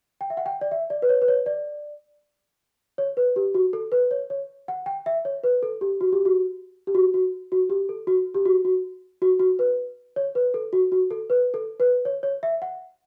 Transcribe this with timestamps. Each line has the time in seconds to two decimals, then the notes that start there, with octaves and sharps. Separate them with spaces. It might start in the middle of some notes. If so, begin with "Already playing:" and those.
0.21 G5
0.30 E5
0.37 F#5
0.46 G5
0.61 D5
0.71 E5
0.90 D5
1.02 B4
1.09 C#5
1.22 B4
1.28 C#5
1.46 D5
2.98 C#5
3.17 B4
3.36 G4
3.54 F#4
3.73 A4
3.92 B4
4.11 C#5
4.30 C#5
4.68 F#5
4.86 G5
5.06 E5
5.25 C#5
5.44 B4
5.63 A4
5.81 G4
6.01 F#4
6.13 G4
6.25 F#4
6.87 G4
6.95 F#4
7.14 F#4
7.52 F#4
7.70 G4
7.89 A4
8.07 F#4
8.34 G4
8.45 F#4
8.65 F#4
9.22 F#4
9.40 F#4
9.59 B4
10.16 C#5
10.35 B4
10.54 A4
10.73 F#4
10.92 F#4
11.11 A4
11.30 B4
11.54 A4
11.80 B4
12.05 C#5
12.23 C#5
12.43 E5
12.62 F#5